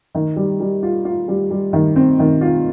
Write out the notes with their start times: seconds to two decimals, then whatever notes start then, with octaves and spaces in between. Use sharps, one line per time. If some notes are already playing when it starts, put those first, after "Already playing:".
0.15 D#3
0.36 G3
0.60 G3
0.83 F4
1.05 F4
1.28 G3
1.50 G3
1.73 D#3
1.96 C4
2.19 D#3
2.41 F4